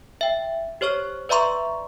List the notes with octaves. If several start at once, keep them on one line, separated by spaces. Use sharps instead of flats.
E5 G5
G4 C5 C#5 C#6 F6
B4 D5 E5 A#5 C6 C#6